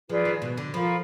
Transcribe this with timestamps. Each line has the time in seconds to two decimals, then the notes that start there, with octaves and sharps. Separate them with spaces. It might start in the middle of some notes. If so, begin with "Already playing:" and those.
0.09 F3 F4 G#4 B4 D5
0.25 D#3
0.42 B2
0.58 D3
0.74 F3 F4 A#4 F5 B5